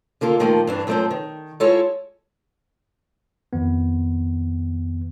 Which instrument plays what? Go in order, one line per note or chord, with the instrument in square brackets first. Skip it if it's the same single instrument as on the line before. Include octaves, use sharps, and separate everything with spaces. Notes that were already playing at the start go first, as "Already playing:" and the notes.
[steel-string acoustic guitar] D3 A#3 F4 A4
A#2 D#3 F3 A3 A#3
G2 E3 D4
F#2 F3 A3 A#3 C4 C5
D#3
G#3 E4 F4 A4 C#5
[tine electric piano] F2 D#3 B3